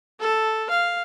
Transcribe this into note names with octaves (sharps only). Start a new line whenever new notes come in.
A4
F5